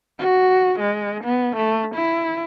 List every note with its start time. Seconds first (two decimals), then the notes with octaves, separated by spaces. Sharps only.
0.19 F#4
0.80 G#3
1.25 B3
1.56 A3
1.96 E4